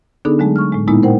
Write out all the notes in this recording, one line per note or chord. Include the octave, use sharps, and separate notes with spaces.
D3 B3 D4 D#4 G#4 A4
D3 F#3 G#3 A3 G#4
C#6 F6
A2 G#3
A#2 G#3 A#3 B3 D#4 E4
A#4 C5 F#5 G5